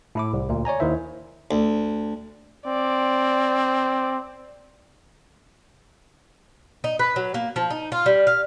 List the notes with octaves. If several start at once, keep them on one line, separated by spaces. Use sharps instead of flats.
A2 E4 D6
C2
D2 A#2
C#5 D5 G#5 A#5
D#2 D#3 E4 C5 E5
D2
C4 D5
D#4
B4
F#3
A#3
F3
D#4
F4
G3
F5